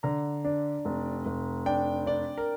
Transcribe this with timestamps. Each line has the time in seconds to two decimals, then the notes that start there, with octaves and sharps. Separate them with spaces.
0.03 D3 A#5
0.44 D4
0.85 F1
1.26 F1
1.66 D4 G5
2.06 D4 D5
2.38 A#4